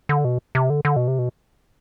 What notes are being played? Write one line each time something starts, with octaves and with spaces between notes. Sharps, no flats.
D3
B2
C3
D3
D3
B2
C3
B2